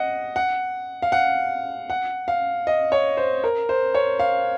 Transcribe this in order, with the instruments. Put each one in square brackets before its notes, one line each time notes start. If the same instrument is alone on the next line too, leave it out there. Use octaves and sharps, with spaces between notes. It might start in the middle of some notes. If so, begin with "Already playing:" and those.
Already playing: [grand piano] D#5 F#5
F#5
F5
F#5
F#5
F5
D#5
C#5
C5
A#4
C5
C#5
F5